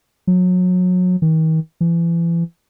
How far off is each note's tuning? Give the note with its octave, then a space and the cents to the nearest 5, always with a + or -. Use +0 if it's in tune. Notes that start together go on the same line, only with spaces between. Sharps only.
F#3 -30
D#3 +40
E3 +35